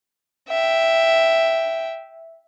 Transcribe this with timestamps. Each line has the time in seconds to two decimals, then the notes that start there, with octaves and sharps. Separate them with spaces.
0.49 E5 G5